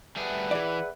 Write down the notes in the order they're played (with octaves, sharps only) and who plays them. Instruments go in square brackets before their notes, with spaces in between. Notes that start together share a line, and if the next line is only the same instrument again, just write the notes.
[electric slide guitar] G3 A3 G#4 [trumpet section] B4 E5 F#5
[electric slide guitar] E3 [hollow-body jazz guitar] G#4 D5